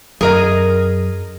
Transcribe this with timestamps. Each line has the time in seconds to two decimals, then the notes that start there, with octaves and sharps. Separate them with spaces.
0.21 F#2 G#4 A#4 D#5